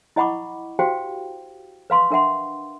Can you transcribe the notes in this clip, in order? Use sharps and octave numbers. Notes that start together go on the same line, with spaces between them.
E4 D#5 F#5 B5 C#6 D6
F#4 G4 C5 F5 G5
B4 F5 C6 C#6
D4 A#4 E5 F#5 C6